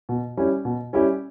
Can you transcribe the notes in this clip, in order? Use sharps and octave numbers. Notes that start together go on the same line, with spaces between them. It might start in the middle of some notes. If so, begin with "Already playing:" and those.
B2
G3 C#4 E4 G4
B2
G3 C#4 E4 G4